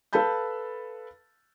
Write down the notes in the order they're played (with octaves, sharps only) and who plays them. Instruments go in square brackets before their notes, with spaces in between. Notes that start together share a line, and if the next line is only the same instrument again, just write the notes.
[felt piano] A4 B4 F5 A5 B5 G6